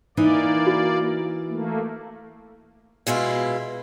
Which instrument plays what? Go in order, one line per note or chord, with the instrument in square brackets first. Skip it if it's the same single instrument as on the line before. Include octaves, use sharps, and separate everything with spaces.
[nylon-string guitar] E3 D#4 [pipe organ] A#3 D5
[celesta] F#4
[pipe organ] A3 A#3
[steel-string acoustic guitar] B2 G#3 E4 F4